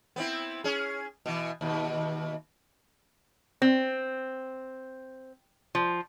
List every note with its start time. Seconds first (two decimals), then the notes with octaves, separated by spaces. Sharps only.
0.16 B3 C4 E4
0.64 C#4 G#4
1.26 B2 E3
1.61 D#2 B2
3.62 C4
5.75 F3